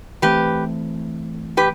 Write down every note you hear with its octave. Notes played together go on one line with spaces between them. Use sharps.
E3 A3 C4 G4 B4
G4 B4